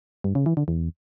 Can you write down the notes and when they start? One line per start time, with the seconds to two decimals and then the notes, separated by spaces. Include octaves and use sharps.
0.24 G2
0.35 C#3
0.46 E3
0.57 D3
0.68 E2